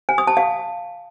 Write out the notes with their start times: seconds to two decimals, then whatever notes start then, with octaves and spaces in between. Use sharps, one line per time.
0.09 G#5
0.18 D#6
0.27 A5
0.37 F5